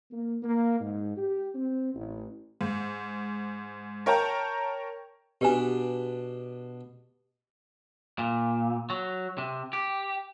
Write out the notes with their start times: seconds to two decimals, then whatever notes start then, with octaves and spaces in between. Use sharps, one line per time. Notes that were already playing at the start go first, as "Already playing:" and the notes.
0.10 A#3
0.43 A#3
0.80 G#2
1.16 G4
1.54 C4
1.93 A1
2.61 G#2
4.06 A#4 C#5 G5 A5 A#5 G6
5.41 B2 D4 G4 B4 G#5
8.19 A#2
8.90 F#3
9.38 C3
9.73 G4